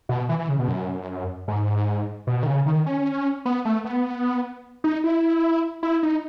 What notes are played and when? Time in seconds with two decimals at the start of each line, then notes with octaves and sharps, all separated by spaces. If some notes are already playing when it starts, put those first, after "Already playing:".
0.09 B2
0.29 E3
0.39 E3
0.49 C#3
0.59 B2
0.68 F#2
1.48 G#2
2.27 B2
2.43 D#3
2.47 C#3
2.66 D#3
2.86 C#4
3.45 B3
3.65 A3
3.85 B3
4.84 D#4
5.04 E4
5.83 E4
6.03 D#4